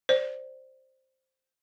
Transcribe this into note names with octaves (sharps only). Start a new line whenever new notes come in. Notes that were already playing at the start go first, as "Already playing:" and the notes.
C5 D5